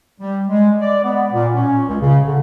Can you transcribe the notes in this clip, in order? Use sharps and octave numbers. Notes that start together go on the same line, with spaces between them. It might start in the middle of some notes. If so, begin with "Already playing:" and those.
G3
G#3
D5
B3
A#2
C#4
C#2
C#3
D3